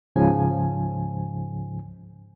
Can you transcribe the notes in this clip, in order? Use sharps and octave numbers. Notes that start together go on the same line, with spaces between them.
C#2 G#2 C#3 F3 G#5